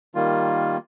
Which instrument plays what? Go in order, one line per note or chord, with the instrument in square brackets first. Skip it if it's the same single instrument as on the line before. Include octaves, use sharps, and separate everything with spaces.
[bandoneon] D#3 G3 A#3 F4